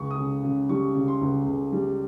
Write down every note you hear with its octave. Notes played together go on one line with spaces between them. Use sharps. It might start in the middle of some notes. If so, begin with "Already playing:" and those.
Already playing: C#2 C#6
D#6
C#3
C#3
G3 C#6
C#3
C6
C#2
C#2
G3